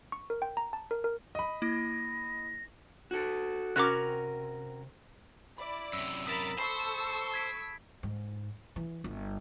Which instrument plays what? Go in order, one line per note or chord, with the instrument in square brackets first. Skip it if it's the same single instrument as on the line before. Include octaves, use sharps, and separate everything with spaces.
[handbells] C#6
A#4
G5
A#5
A5
A#4
A#4
[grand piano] D#5 B5
[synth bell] A#3 E4 [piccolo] A#6
[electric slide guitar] F#4 A4
[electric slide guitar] C3 [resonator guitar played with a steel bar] C#4 F#4 A#4 [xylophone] D6 F#6
[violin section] E4 D5 [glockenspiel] B5
[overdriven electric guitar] F#2 C3 [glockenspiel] E6
[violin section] A#4 B5 A6 [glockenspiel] D#6 B6 E7
[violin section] A4 C#6 E6 [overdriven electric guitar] C5 [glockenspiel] B5 C7
[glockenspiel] G#6 B6 D7
[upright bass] G#2
E3
G1